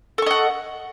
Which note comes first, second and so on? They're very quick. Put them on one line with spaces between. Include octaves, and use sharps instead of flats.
A4 C#6 D#5 F#5